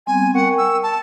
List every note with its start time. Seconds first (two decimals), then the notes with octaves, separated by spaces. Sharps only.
0.07 G3 B3 C4 G#5
0.34 A#4 F#5 G5 C#6
0.58 E6
0.83 A5